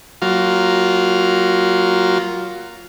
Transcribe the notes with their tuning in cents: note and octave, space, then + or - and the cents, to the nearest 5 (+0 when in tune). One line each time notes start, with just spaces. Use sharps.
F#3 +15 A#3 +0 F4 +0